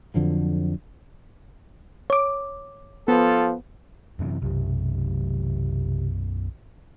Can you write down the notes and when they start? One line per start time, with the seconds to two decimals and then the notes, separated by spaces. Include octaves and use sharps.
0.14 F2 D3 F3 F#3
2.10 C#5 D6
3.08 F3 B3 F4 A4
4.19 F#2 C3 E3
4.42 B1 F#2 C3